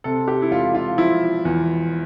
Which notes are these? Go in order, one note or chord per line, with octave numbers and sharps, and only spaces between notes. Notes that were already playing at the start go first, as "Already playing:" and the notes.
C3 A4
G4
E4
E1 F4
F4
F3 E4
E2